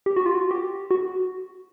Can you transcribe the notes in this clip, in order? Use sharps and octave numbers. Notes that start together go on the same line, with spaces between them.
G4
F#4
F4
F#4
G4
F#4